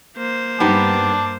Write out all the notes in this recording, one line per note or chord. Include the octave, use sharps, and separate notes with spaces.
A#3 C5
G2 B3 D#4 G4 A5 D6